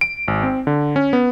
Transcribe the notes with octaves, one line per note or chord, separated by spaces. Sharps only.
D7
G#1
C4
D3
C#4
B3